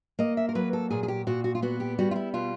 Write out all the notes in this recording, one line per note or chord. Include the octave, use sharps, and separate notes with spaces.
A#3 D#5
E5
A#4
F#3 B4
A4
A#2 G#4
G#4
G4
A#2 F#4
F#4
F4
B3 F#4
G4
G3 F#4
F4
E4
B2 F4